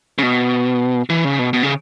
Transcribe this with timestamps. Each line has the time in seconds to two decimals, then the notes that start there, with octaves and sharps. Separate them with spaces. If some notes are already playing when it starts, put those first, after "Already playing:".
0.18 C#3
0.23 B2
1.10 E3
1.24 C#3
1.39 B2
1.53 B2
1.63 C#3